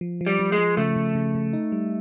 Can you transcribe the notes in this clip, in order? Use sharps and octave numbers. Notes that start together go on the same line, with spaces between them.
F3
F3
G3
F3
G#3
F3
C#3 A3
C#3
C#3
C#3
D#4
G3